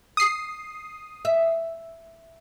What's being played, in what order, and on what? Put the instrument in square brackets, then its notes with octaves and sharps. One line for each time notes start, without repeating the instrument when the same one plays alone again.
[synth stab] D#6 C7
[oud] E5